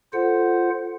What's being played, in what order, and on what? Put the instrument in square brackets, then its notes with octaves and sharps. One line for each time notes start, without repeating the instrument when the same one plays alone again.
[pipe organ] F4 C5 F#5 [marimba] A4